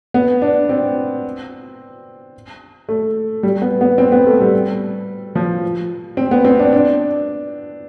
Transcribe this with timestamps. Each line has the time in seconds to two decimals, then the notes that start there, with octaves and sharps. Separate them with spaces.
0.14 B3
0.42 D4
0.69 C4
2.89 A3
3.43 G3
3.62 B3
3.81 B3
3.98 C4
4.12 B3
4.27 A3
4.40 G3
5.35 F3
6.17 C4
6.31 B3
6.45 C4
6.59 D4
6.73 D4